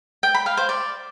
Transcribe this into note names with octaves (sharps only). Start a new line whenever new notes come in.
G5
B5
F5
C5
D5